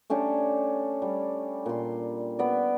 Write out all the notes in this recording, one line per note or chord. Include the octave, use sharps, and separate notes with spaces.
A3 C#4 D4 G4
G3
A#2 C6
B3 D5